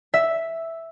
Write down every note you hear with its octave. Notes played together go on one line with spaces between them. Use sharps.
E5